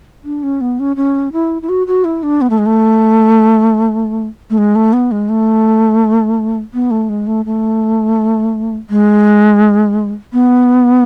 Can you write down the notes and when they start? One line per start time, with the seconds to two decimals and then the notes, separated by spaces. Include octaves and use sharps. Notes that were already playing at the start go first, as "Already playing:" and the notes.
0.24 D4
0.43 C#4
0.61 B3
0.79 C#4
0.96 C#4
1.32 E4
1.62 E4
1.69 F#4
1.87 F#4
2.04 E4
2.23 D4
2.41 B3
2.50 A3
2.58 G#3
2.66 A3
4.50 A3
4.58 G#3
4.75 A3
4.93 B3
5.11 G#3
5.29 A3
6.74 B3
6.91 A3
7.09 G#3
7.27 A3
7.45 A3
8.90 G#3
10.33 B3